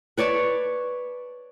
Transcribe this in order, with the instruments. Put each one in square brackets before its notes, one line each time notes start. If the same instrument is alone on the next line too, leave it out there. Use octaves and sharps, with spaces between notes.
[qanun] B4 C#5 D5 A5